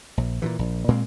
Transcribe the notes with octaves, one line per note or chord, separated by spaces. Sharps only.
A#1
A#2 C#3 E3
A#1
A#2 G#3 A#3 C4